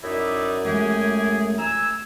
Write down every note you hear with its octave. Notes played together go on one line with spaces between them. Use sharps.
F#2 D#4 E4 D5
G#3 A3 G4 G#4 G#5
G#5 A#5 E6